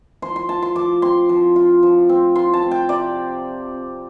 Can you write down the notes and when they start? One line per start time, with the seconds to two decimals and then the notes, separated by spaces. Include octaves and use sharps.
0.22 F3 C6
0.36 C6
0.49 F4 A5
0.62 C6
0.76 F3 D6
1.02 C4 C6
1.29 F3
1.56 F4
1.83 F3
2.09 C4
2.35 F4 C6
2.53 A5
2.63 C4
2.71 G5
2.89 C3 D5